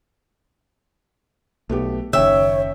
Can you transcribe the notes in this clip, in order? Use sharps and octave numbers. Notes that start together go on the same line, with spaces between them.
B1 A3 B3 G4
F#1 D#2 C#3 C#5 E5 G5